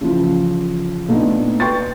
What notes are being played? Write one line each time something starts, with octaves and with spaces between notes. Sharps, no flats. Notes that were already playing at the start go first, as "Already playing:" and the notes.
C#3 E3 F3
A#2 A3 B3 D4 D#4
B4 G5 C6 C#6 A6